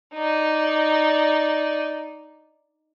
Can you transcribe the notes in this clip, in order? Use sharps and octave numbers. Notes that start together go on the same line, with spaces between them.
D#4 D5